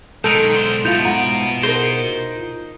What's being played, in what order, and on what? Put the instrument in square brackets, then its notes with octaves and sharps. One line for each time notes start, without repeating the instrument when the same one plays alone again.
[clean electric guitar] B1 G#3 A#4 [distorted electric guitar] D#3 [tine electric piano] A4 [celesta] G6
[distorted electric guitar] D3 C5 [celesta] G6 G7
[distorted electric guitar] B2 B3 [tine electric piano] E4 F4 [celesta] G6 F7
[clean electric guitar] G#2 [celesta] F#5 A#5
[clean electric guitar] D#4 C5 [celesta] G#4 A#4